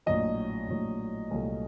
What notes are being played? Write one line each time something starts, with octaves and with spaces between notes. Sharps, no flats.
A#1 A2 F#3 D#5
A#1 A2 F#3
C2 A#2 F#3 A3